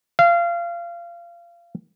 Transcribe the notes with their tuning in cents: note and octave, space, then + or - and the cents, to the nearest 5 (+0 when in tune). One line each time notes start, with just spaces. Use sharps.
F5 -25